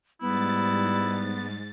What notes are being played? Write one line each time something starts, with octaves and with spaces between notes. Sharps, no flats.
G#2 G3 B3 E4 A6